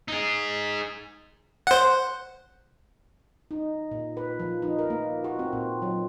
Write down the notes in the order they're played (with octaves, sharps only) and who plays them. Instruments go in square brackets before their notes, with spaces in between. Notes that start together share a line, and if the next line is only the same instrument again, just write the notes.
[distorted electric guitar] D#4 G#4
[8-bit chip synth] C5 F#5
[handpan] D#4
A#2
B4
F3
D#4
A#4
A#3
F#4
C4
A#2
F#3